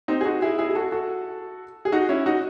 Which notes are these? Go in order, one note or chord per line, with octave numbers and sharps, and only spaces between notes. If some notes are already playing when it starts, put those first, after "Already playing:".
C4 D#4
G#4
D#4 F#4
E4 G#4
E4 G#4
G#4
F#4 A4
F#4 A4
G#4
D#4 F#4
C#4 E4
D#4 F#4